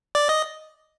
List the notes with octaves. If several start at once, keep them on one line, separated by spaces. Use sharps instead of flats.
D5
D#5